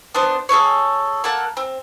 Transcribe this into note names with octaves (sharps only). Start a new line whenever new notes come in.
B3 D4 C5
G#4 A4 B4 C#5
A#3 A4 F#5 A5
C4